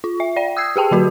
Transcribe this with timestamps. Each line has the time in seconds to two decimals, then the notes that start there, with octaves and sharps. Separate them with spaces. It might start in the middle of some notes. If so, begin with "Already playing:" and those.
0.04 F4
0.20 E5
0.36 D5 G5
0.57 D#6 E6 G#6 C7
0.76 G4 G#4 G5 A5
0.91 D3 F#3 F#4 B4